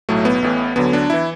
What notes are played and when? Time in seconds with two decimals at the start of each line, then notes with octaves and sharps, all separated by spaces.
0.09 B1 A2 F#3 A3
0.25 B3
0.42 A1 A2 E3
0.76 D2 D3 F#3 B3
0.93 D4
1.10 E3 E4